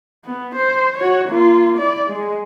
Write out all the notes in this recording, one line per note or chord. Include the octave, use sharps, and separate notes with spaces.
B3
C5
F#4 C#5
A#3 F4
E4 D5
G#3